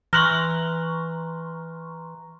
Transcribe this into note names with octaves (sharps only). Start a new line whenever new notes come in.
E3 A#5 C6 C#6 F6 F#6 A#6 F#7